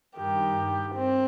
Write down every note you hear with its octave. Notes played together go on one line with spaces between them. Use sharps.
G2 D#3 G4
C4